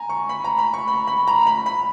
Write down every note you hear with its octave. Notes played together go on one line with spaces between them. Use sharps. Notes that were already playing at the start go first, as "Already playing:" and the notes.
Already playing: G#5 A#5
C#6
B5
A#5
B5
C#6
B5
B5
A#5
B5
B5